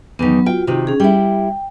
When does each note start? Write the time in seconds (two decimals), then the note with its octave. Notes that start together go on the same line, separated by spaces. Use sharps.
0.19 E2 D#3 F#3 B3
0.46 F4 F#4 G5
0.67 C3 D#3
0.87 C#4 G#4
1.00 G3 E4 G5